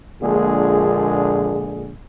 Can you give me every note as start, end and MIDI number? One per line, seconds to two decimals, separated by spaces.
0.22 1.92 34
0.22 1.92 46
0.22 1.92 50
0.22 1.92 56
0.22 1.92 68